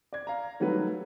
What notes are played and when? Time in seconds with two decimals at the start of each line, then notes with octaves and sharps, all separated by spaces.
0.13 D5 G#6
0.27 F5 A#5
0.60 D#3 F#3 G3 A3 F#4 B4